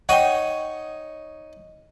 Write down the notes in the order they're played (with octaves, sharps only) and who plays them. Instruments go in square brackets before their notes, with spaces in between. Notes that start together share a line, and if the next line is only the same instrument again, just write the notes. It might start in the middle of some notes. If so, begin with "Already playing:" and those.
[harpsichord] D#4 C#5 D#6 [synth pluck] F#5 G5